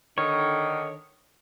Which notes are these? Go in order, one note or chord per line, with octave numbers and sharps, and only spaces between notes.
D3 D#3 C#5